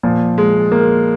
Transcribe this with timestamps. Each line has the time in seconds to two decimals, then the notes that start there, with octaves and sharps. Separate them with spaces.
0.03 A#2 F3
0.38 G#3
0.72 A#3